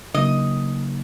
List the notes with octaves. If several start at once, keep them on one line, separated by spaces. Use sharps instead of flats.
C#3 F#3 A#3 D#4 D#5